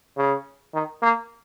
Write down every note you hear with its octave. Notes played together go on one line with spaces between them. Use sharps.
C#3
D#3
A#3